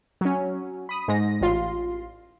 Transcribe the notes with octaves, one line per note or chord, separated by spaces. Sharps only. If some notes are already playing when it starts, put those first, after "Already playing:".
F#3 C#4
B5 D#6
G#2 G#3 A#6
A1 F4 C6